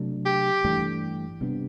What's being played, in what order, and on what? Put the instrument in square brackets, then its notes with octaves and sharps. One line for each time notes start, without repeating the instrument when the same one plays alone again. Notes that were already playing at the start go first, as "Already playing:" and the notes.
Already playing: [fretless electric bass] C3 F#3 A3 D4
[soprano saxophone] G4
[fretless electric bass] G2 E3 A3 D4
C3 G3 B3 D4